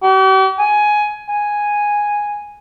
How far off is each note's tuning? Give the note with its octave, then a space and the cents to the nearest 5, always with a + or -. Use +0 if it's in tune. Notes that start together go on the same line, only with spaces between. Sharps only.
G4 -45
G#5 +10
G#5 -5